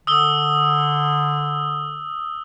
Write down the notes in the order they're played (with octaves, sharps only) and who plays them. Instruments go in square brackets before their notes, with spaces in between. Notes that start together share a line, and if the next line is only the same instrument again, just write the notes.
[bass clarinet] D3 [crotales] D#6 E6 G7